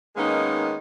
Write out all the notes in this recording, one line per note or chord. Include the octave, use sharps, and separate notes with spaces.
D#3 G#3 A#3 B3 C#4 D#4